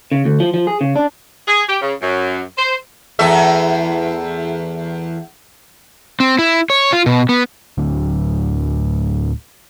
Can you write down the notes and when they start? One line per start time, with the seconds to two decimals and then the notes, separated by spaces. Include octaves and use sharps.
0.12 C#3
0.25 D2
0.40 F3
0.54 F3
0.67 G#4
0.81 C#3
0.96 D4
1.47 G#4
1.68 G4
1.82 C#3
2.01 F#2
2.58 C5
3.19 E2 A3 E5
6.20 C4
6.39 E4
6.70 C#5
6.93 F4
7.06 B2
7.29 B3
7.78 D1 D2 D3 F#3